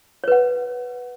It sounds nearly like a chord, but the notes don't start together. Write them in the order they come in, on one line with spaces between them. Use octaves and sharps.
C#5 B4 F#5